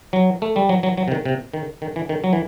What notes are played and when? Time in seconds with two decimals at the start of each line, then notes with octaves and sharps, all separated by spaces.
0.13 F#3
0.42 A3
0.56 G3
0.69 F#3
0.83 F#3
0.97 F#3
1.08 C3
1.12 D#3
1.25 C3
1.54 D#3
1.82 D#3
1.96 E3
2.09 D#3
2.24 F#3
2.33 E3